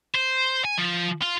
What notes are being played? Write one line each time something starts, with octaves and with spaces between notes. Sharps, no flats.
C5
G#5
F3
F4